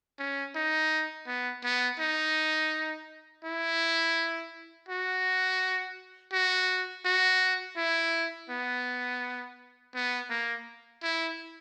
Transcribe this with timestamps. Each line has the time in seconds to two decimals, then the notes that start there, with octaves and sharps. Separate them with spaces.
0.19 C#4
0.55 D#4
1.27 B3
1.64 B3
2.00 D#4
3.44 E4
4.89 F#4
6.32 F#4
7.05 F#4
7.77 E4
8.50 B3
9.95 B3
10.30 A#3
11.03 E4